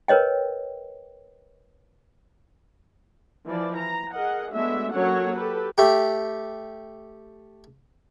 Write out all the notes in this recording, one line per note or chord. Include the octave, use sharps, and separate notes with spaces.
A#4 B4 C#5 D#5 G5
E3 F3 D5
A#5
G#4 A#4 D#5 F#5
G#3 A3 B3 D4 F#4 E5
F#3 A#3 C#4 A4 C#5 F#5
G4 A4 B4
A3 G4